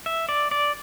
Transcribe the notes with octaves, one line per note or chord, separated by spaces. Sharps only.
E5
D5
D5